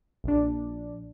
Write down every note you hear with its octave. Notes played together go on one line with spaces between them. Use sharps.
A#1 D4